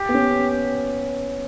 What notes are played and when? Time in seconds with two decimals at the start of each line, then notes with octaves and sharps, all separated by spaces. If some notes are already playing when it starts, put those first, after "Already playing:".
Already playing: G4
0.09 B3
0.14 C#4